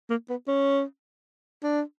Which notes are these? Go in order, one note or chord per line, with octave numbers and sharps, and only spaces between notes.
A#3
B3
C#4
D4